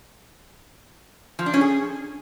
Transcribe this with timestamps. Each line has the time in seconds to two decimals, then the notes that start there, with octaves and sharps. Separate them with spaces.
1.39 F3
1.46 D4
1.54 C#4
1.61 G#4